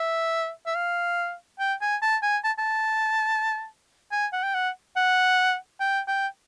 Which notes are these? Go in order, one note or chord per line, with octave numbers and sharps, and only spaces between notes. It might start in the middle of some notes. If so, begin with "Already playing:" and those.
Already playing: E5
E5
F5
G5
G#5
A5
G#5
A5
A5
G#5
F#5
G5
F#5
F#5
G5
G5